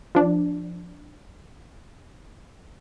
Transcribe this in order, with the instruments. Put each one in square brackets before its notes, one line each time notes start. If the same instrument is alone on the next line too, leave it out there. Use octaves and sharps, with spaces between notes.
[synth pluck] F3 D4